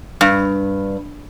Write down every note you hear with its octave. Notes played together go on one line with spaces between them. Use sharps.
G2